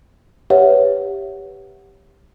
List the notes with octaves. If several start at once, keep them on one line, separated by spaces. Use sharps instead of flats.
G4 B4 C#5 E5 F#5